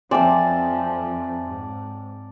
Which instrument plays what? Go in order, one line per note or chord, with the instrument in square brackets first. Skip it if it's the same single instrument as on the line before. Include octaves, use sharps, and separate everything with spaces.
[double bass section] F2 F3 [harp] C4 [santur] D5 A5 [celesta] E5 G#5 C6
[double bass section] G#2